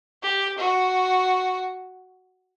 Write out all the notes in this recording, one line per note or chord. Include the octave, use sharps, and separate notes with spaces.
G4
F#4